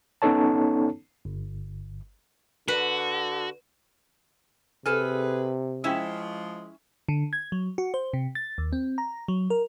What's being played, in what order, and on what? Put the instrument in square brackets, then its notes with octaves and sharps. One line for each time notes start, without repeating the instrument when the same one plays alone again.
[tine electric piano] B3 C#4 D#4 A4 C#5 A5
G1
[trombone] D3 [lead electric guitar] F#4 [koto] B4
[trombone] C3 [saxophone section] G#4 B4 [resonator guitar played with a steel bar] A4 G#5 [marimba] F6
[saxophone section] F3 G#3 [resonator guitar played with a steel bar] C#4 E4 E5 [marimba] G5 E6
[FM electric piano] D3
G#6
F#3
F#4
C5
C3
A6
D#2
C4
A#5
F#3
A#4